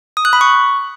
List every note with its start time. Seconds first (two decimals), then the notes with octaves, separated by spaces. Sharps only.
0.17 D#6
0.25 F#6
0.33 B5
0.41 C#6